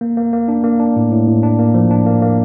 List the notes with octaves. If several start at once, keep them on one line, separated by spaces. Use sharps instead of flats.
A#3
A#3
A#3
D4
A#3
D4
A2
A2
A2
D4
A#3
F3
D4
A#3
A#3